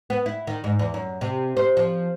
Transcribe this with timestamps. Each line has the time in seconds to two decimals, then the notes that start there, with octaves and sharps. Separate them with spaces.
0.10 B3
0.26 E4
0.47 D#3
0.64 G#2
0.79 E2
0.94 F#2
1.21 C3
1.57 C5
1.77 F3